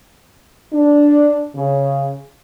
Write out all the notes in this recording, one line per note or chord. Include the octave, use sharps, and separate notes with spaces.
D4
C#3